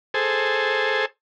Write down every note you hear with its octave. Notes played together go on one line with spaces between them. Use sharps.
G#4 A4 C5